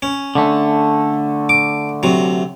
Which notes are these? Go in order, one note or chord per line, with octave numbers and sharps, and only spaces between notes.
C#4
D3 A3
D6
C3 F#3